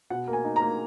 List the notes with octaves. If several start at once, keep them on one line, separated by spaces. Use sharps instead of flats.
B2 F#5
A#3
G#5
D#4
A#5
A#3